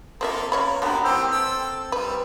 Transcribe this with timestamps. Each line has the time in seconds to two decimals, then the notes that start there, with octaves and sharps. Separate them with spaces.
0.21 A#3 C4 F4 A4 A#4 E5
0.52 C#3 A#4 C#5 B5
0.82 G#3 A#3 B3 D4 F#4 G4 A#4
1.04 E3 C4 G4 C5 G5
1.32 A4 E6
1.92 G3 B4